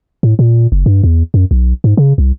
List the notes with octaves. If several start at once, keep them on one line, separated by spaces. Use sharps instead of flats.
A2
A#2
F#1
G2
E2
F#2
B1
G#2
C#3
C2